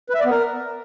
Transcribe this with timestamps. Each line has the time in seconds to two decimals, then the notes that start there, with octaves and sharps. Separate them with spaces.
0.09 B4
0.15 E5
0.20 D5
0.25 B3
0.30 A#4